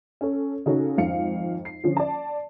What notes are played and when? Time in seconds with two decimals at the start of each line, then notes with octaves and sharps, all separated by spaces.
0.21 C#4 A4
0.66 C#3 C#4 D#4 F#4 A4
0.97 G#1 F2 F5 C#7
1.65 C7
1.84 D3 F3 C#4
1.97 D5 A5